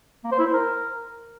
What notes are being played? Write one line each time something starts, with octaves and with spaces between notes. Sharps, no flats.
A#3
C5
E4
C5
A#4